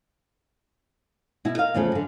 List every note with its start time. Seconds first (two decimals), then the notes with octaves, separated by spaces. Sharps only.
1.45 B2 E4
1.57 A#4 D#5 F5
1.74 E2 C#3 F3 A3
1.92 F#2 D3